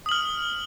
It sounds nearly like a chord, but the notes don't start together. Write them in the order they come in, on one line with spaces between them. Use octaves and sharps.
D#6 F#7 F6